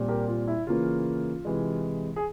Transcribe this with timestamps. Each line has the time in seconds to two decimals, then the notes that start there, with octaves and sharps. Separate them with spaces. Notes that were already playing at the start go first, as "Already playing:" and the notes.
Already playing: A#2 G3 C4
0.08 G4 A#4
0.28 F4
0.48 E4
0.67 C#3 E3 A#3 C#4 F4
1.45 C3 E3 G#3
2.16 G#4